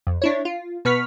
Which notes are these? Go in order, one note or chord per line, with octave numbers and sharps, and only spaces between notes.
F2
D4 E4 C#5
F4
B2 B4 C#6 F6 B6